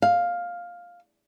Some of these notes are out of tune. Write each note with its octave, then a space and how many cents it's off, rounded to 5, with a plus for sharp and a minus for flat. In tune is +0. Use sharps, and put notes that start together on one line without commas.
F5 +5